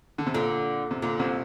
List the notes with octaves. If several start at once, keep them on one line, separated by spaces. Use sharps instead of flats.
D3
C3
A#2 D3
C3
A#2 D3
C2 C3